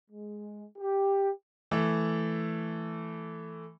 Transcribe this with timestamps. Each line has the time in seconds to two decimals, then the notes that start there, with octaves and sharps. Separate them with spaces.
0.11 G#3
0.78 G4
1.71 E3 A3